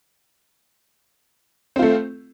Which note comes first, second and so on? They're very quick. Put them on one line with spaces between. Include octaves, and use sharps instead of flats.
C4 F4 A3